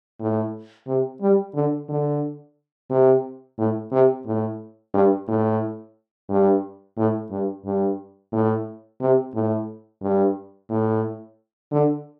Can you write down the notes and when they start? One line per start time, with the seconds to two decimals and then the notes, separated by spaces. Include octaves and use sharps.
0.20 A2
0.87 C3
1.21 G3
1.55 D3
1.89 D3
2.91 C3
3.58 A2
3.92 C3
4.26 A2
4.94 G2
5.28 A2
6.29 G2
6.98 A2
7.31 G2
7.65 G2
8.33 A2
9.01 C3
9.35 A2
10.02 G2
10.70 A2
11.72 D3